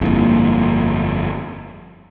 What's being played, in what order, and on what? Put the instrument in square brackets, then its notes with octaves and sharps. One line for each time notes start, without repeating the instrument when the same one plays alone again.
[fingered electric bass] G1 F2 [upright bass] A#3 E4